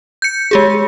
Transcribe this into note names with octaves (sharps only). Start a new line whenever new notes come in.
G6 C#7
G#3 G4 G#4